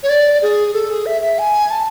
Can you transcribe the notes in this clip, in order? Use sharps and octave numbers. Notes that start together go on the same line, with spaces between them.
C#5
D5
G#4
A4
G#4
E5
E5
G#5
A5